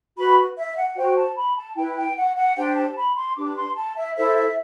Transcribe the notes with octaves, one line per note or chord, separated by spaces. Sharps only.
F#4 B4 B5
E5
F#5
F#4 C5 G5
A5
B5
A5
E4 B4 G5
G5
F#5
F#5
D4 G4 C5 G5
A5
B5
C6
D4 G4 B4 D6
C6
A5
E5
E4 A4 C5 E5
E5